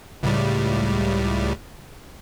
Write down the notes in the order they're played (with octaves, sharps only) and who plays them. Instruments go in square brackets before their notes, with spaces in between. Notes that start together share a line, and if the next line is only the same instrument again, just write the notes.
[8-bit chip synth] C#2 A2 G3